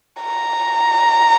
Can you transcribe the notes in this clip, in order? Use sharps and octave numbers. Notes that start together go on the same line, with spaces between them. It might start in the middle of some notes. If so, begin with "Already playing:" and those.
A#5